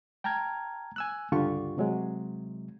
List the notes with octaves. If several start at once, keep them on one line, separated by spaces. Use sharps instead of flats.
G5 A5 A#5 F6 G#6
G#5 E6 F#6
C#2 G2 D3 F4 G4 C#6
C3 F#3 G#3